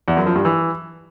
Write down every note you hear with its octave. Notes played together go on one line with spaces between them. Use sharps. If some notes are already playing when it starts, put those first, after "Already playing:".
E2
F#2
F3
G2
E3